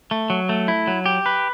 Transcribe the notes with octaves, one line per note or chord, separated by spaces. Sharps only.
A3
F#3
A3
E4
F#3
G4
B4